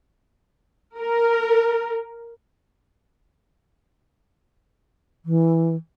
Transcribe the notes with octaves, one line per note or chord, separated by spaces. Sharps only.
A#4
E3